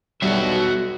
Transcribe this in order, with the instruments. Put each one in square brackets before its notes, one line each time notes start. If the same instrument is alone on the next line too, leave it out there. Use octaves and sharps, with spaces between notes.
[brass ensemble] B1 B2 [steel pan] G3 [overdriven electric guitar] F#4 E5